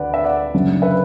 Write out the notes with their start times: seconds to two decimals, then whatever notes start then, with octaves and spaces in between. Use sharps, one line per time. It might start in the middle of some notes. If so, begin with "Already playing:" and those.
Already playing: D2 D3 B4 D5 F#5
0.14 E5
0.24 D5 F#5
0.54 F#1 F#2 D3
0.82 B4 E5